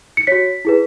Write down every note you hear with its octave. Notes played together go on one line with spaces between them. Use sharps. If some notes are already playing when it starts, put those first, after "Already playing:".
C#7
F#4 C#5 B6
E4 G#4 B4